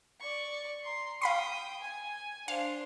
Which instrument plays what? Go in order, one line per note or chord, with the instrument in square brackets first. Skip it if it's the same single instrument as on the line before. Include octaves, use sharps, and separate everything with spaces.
[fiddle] D5 C#6
A#5 C6
[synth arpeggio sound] F5 B5 C6 [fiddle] G5 D#6
[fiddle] G#5
[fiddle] D4 C5 [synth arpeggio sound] F5